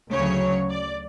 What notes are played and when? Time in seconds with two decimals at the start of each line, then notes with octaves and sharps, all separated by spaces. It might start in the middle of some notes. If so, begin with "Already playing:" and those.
0.12 D2 C#3 F#3 C#5
0.70 D5